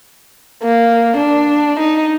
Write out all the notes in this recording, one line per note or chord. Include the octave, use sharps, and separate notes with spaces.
A#3
D4
D#4